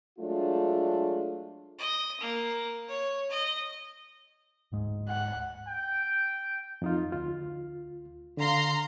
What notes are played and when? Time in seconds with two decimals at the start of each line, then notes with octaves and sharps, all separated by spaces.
0.19 F#3 G#3 A3 D4 F4
1.79 D#5
2.20 A#3
2.88 C#5
3.30 D#5
4.72 D1 G#2 G#3
5.09 F#5
5.67 G5
6.82 F2 D#4 F4
7.12 D2 F4
8.37 D3 F5 A#5 C6